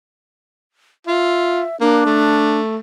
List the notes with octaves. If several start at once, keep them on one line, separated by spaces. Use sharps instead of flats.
F4 E5
A#3 D4
A3